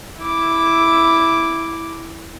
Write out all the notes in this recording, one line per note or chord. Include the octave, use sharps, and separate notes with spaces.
E4 D6